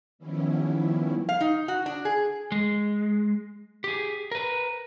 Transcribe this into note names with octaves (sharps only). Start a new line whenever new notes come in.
D#3 F3 G3 B3 C#4 E4
F5
D#4
F#4
D4
G#4
G#3
G4 G#4
A#4 B4